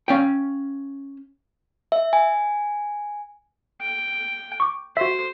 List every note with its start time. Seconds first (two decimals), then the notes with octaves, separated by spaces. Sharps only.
0.08 C#4 F5 G5
1.92 E5
2.13 G#5
3.81 G5
4.60 C#6 D6
4.97 F#4 C5 E5